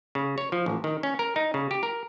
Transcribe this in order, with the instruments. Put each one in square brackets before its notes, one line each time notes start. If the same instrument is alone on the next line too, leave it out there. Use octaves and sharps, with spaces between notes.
[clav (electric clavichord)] C#3
C#5
F3
A1
D#3
C#4
A#4
D#4
C#3
G4
A#4